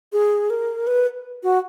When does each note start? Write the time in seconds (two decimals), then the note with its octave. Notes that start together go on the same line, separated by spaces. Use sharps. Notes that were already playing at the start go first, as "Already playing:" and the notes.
0.13 G#4
0.50 A#4
0.87 B4
1.43 F#4